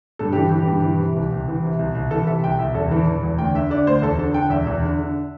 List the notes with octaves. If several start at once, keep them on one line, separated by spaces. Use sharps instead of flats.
G2 A4
E3 G4
E3
G4
G2
E3
C3
C2
C2
E3
C3
C2
C2
E3 A4
C3 E5
C2 G5
C2 E5
E2 A4
E3
E3
E2
D2 G5
D3 E5
D3 D5
D2 C5
E2 A4
D3 A4
D3 G5
E2 E5
E2
D3
D3